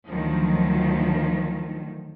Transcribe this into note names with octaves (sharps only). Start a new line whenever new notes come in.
D2 D#3 F3 F#3